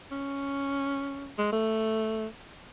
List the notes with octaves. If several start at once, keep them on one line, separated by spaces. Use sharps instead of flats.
C#4
G#3
A3